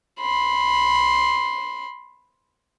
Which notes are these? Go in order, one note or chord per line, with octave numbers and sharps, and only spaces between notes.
B5 C6